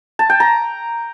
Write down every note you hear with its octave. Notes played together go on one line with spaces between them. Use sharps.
A5
G5
A#5